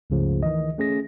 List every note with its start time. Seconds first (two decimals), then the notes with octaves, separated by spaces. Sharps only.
0.10 C#2 G2 C#3 F3 A3
0.43 D#3 E3 D#5
0.78 A3 C#4 G#4 A#6